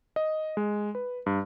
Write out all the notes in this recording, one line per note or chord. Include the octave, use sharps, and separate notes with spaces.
D#5
G#3
B4
G2